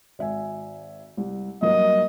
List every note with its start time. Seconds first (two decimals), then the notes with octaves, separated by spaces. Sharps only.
0.19 G#1 E5 G#5
1.17 C2
1.62 G2 F#3 A#3 D#5